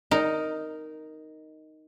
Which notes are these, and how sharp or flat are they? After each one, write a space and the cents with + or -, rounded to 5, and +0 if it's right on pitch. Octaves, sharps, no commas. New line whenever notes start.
D#4 +0 A#4 +0